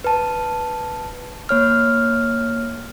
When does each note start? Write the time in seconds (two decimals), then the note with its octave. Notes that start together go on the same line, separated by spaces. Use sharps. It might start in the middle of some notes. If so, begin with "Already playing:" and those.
0.04 B4 A5
1.49 A#3 C#5 F6